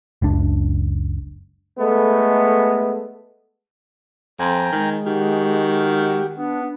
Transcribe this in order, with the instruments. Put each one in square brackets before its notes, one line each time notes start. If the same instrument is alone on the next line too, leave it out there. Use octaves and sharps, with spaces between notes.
[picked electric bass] F#1 C#2 D4
[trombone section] G#3 A3 B3 A4
[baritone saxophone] F2 [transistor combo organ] G5 G#5 A#5
[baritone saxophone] D#3 [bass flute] G#3
[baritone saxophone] D#3 [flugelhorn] F#4 [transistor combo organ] G4
[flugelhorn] B3 [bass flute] D4